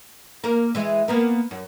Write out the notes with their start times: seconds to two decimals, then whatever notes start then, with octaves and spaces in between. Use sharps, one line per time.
0.44 A#3 A#4
0.75 E3 G#3 E4
1.08 A#3 B3 A#4
1.51 F#2